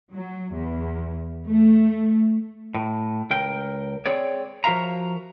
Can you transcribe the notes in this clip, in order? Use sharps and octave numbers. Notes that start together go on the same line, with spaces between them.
F#3
E2
A3
A2
C#2 A#4 G5
C4 G#4 C#5 D5
F3 F#4 A#4 E5 F5 A#5